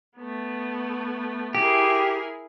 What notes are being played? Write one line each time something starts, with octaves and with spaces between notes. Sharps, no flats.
A3 B3
E4 G4 G#4 A#4